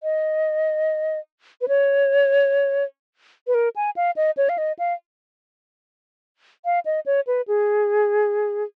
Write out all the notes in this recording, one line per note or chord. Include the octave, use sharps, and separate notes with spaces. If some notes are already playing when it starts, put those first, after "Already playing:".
D#5
B4
C#5
B4
A#4
G#5
F5
D#5
C#5
F5
D#5
F5
F5
D#5
C#5
B4
G#4